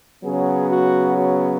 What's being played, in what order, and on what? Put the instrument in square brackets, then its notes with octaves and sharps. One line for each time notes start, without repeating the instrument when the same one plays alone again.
[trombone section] C#3 F#3 B3 G#4
F#4
F#4